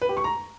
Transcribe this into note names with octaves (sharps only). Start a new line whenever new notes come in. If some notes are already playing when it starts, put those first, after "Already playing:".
B4
G4
C#6
A#5